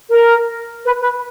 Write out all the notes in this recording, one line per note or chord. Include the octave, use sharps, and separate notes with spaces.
A#4
B4
B4